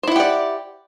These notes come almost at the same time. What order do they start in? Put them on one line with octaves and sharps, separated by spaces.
C5 E4 F#5 G4 D5